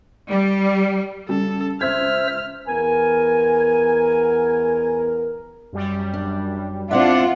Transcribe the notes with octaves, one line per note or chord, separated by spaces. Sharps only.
G3
C#3 G3 A4
C#2 C5 E5 C6 E6 F6 G#6
E2 B3 A#4 G#5
F#2 G3
D4
C4 D4 E4 F4 E5 F#5